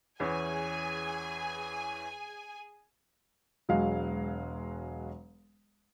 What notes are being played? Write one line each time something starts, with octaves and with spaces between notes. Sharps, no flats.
E2 E3 C#4 G#4 G#5
E1 F#3 G#3 F#4 F5